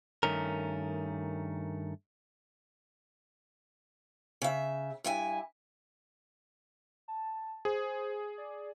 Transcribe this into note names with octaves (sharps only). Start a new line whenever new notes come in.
G2 D#3 A3 C#4 A#4
C#3 E5
G2 E4 G#5
A5
G#4 C5
D5